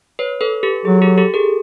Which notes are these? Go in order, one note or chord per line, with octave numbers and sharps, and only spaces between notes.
B4 C#5
A4 B4
G4 A4
F#3 G#4
G4 A4
G4 A4
G#4 A#4